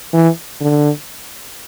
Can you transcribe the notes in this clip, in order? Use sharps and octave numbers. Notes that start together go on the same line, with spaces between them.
E3
D3